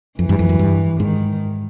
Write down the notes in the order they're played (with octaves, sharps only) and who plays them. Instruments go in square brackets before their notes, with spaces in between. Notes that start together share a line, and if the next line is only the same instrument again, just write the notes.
[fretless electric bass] F2 [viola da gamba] E3
[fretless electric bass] G2
F2
F#2
G2
[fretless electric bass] G#2 [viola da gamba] D#3